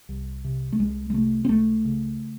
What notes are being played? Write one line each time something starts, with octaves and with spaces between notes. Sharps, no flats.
C2
C3
A3
C2 G#3
G#3
C3 A3
C4
C#2 A3
C#3